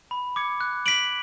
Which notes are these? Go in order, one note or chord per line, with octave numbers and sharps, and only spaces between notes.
B5
D6 G#6 C#7
F#6
B6 D7 F#7